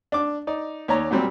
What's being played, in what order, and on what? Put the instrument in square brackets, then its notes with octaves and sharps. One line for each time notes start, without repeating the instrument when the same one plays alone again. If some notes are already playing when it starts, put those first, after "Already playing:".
[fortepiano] D4 D6
D#4 D5
D#2 C#5 D5 A#5
A#2 F#3 G3 C4